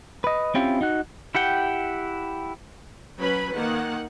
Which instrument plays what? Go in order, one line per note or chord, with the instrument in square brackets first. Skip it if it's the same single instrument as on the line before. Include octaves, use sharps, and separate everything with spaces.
[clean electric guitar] B4 D#5
C4 C#4 E4 F4 G4
D#4 F#4 F#5
[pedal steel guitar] E4 G4 F#5 G5
[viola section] F#3 C#4 B4 B5
D#3 A#3 F#5